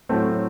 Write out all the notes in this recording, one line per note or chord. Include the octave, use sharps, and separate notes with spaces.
A2 F#3 A3 C4